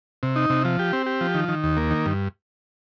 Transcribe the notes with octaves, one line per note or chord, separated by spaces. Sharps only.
C3
D#4
C3
F3
G4
C4
G4
F3
D#3
D#3
D#2
A#3
D#3
G2